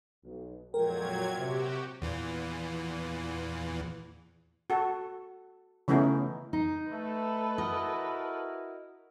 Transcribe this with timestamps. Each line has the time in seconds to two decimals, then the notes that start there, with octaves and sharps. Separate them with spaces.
0.24 B1
0.74 F2 A#2 F#3 G#3 A#4 G5 G#6
1.38 C3 F#4 G4
2.02 E2 A#2 E3
4.70 F#4 A4
5.88 C#3 E3 A3 B3 C#4 D#4
6.53 D#4
6.91 A3 A4 B4
7.58 E4 F#4 A#4 D#5